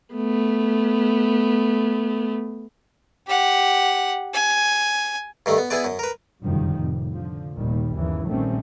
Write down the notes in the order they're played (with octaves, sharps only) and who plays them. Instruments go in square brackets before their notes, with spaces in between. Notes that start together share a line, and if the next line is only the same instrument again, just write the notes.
[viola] A3 B3
[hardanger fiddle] G4 F#5
G#5
[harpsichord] G2 D#3 A3
B3
B3 E4 G#4 B4 D5
F#2
A#4 B4
[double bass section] F1 F#2 D3 D#3 F3 G3
F1 A2 C3
D3 F3
F1 D#2 A#2 D#3 G3
G1 D#2 C#3 E3
A#1 D#3 G3 A3 C4 C#4